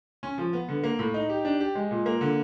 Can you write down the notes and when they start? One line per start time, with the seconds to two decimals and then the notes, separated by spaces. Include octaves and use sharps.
0.23 C#4
0.38 F3
0.53 B3
0.68 D3
0.84 A#3
0.99 A2
1.14 D#4
1.29 G4
1.45 D4
1.60 G4
1.75 G#3
1.91 A#2
2.06 A#3
2.21 D3